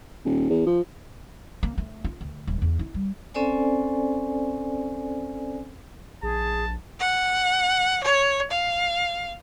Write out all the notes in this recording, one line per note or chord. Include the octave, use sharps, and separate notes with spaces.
D#1
E2
F3
A#3
A3
F4
D2
D#1
E2
E4
G3
C4 C#4 A4 C5 D5 G#5
A#1 G#4 A5
F#5
C#5
F5